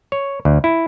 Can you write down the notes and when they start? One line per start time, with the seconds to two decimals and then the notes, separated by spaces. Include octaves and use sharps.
0.12 C#5
0.45 D2
0.64 E4